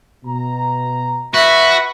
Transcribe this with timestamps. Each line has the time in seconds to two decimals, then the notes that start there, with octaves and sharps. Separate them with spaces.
0.25 B2 A#5
1.34 F#4 B4 E5